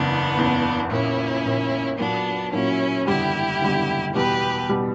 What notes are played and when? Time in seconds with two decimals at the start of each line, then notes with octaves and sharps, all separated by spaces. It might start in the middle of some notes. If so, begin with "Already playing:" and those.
Already playing: F#1 E2 C#3 B3 D4
0.36 F#1 E2 C#3
0.91 A#1 A#2 A#3 C#4 E4
1.45 A#1 A#2 A#3
1.98 A#2 F#3 A#3 B3 D4
2.52 A#2 F#3 A#3 C#4 E4
3.07 F#1 E2 D3 G3 E4 G4
3.61 F#1 E2 D3 G3
4.15 E2 B2 G3 G4 B4
4.69 B2 G3